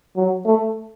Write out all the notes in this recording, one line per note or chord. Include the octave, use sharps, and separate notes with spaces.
F#3
A3